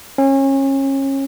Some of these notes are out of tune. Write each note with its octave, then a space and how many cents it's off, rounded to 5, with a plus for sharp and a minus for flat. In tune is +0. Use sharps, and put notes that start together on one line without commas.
C#4 -30